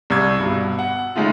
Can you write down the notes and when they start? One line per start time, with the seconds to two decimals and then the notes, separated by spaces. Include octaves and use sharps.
0.10 C2 D5 C#6 E6 G#6
0.39 G2 B2
0.79 F#5
1.16 C#3 G#3 A3 D#4 F4